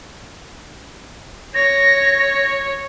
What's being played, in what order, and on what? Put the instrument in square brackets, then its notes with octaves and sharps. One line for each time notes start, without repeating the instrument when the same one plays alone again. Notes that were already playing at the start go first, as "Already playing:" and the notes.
[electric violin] C#5 [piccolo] A#6